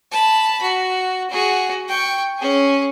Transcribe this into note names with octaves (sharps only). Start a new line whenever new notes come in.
A5 B5
F#4
F#4 G#4
G5 C#6
C#4 G#4